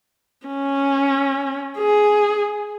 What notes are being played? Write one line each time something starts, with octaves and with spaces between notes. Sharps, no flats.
C#4
G#4